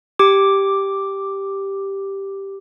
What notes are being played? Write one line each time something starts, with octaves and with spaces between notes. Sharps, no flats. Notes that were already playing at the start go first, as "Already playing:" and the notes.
G4 D6